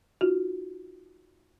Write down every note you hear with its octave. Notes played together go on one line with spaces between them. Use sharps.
D#4 F4 F#4